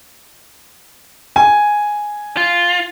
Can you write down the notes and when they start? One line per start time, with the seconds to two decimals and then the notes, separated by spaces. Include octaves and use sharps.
1.36 G#5
2.37 F4